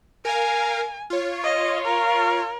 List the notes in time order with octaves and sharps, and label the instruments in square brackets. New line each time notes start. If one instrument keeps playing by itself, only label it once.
[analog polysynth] A#4 F5 [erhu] G#5
[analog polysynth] F4 C#5
[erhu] D#5
A#4